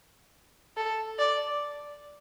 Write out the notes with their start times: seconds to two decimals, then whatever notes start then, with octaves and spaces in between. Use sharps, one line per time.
0.77 A4
1.18 D5